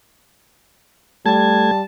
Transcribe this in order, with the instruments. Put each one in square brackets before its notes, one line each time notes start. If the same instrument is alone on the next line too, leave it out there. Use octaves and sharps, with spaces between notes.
[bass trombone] G3 [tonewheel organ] A3 G#6 [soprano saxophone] A5